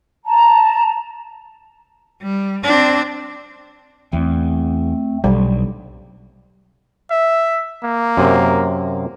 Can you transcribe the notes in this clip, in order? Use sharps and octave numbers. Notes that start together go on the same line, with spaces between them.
A5 A#5
G3
C4 D4
E2 A3 C4
B1 G3
E5
A#3
F#2 C3